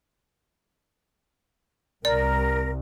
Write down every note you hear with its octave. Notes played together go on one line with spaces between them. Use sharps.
C2 A#4 D5